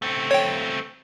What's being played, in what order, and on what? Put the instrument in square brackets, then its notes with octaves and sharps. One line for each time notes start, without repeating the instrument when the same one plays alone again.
[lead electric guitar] A3 C4
[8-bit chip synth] C#5 G5